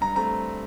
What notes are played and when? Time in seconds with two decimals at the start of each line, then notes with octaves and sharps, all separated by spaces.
0.01 G2 A#5
0.15 A3 C4 A#5